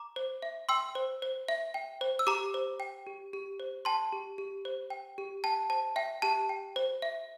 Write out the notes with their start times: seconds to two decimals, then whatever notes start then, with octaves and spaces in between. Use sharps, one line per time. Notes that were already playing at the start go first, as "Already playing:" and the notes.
Already playing: A#5 D6
0.16 C5
0.42 E5
0.69 G5 C6 E6
0.95 C5
1.22 C5
1.48 E5
1.74 G5
2.01 C5
2.19 E6
2.27 G4 A#5 D6
2.54 C5
2.80 G5
3.07 G4
3.33 G4
3.60 C5
3.85 G5 A5 C6
4.13 G4
4.38 G4
4.65 C5
4.90 G5
5.18 G4
5.44 G5 A5
5.70 C5 A5
5.96 E5 G5
6.22 G4 A5
6.49 G5
6.76 C5
7.02 E5